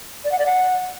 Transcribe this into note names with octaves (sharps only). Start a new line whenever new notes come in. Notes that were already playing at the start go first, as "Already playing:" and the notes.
D5
F#5
D5
F#5